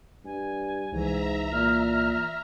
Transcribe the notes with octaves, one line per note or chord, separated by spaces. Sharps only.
G2 G#5
C2 G#2 E3 E5 A#5
A#2 F6